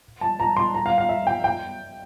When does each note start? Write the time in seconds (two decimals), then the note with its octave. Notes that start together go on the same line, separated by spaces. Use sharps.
0.21 A5
0.40 A#5
0.57 C6
0.74 A#5
0.86 F5
0.98 F5
1.09 E5
1.27 G5
1.44 G5